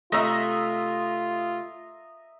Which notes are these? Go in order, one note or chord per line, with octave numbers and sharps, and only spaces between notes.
C3 A3 F4 D#5 E5 A#5